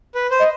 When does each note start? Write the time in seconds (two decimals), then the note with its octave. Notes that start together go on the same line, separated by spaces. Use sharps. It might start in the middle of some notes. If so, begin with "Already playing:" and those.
0.15 B4
0.31 C5
0.40 D#5